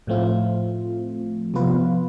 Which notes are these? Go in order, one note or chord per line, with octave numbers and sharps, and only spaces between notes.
A2 F3 A3 C4 F4
C3 F3 B3 F4 B4